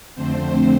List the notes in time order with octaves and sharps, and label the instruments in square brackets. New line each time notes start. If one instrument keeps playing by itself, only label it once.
[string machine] F2 D3 A3 C4 C5